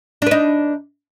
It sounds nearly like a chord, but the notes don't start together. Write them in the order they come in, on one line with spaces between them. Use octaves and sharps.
D4 B4 D#4